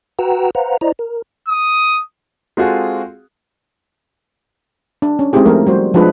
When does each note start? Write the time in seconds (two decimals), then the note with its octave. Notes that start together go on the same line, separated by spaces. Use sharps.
0.19 F#4 B4 F#5 G5 A#5 E6
0.55 B4 C5 F5 F#5 A#5
0.81 E4 C5 D5 D#5 A#5
0.99 A#4
1.48 D#6
2.57 G#3 C4 F4 F#4 G#4 A4
5.02 D4
5.19 C#4
5.33 G#3 C4 D#4 E4 G4 G#4
5.46 F3 A3 A#4
5.67 G3 F#4 C5
5.94 F3 G#3 D4 F4 G#4 B4